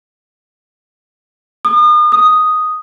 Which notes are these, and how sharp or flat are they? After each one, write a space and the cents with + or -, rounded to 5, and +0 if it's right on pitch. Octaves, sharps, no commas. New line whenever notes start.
D#6 -40
D#6 +0